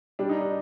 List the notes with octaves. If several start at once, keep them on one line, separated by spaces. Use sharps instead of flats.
G3 D4
D#4
D4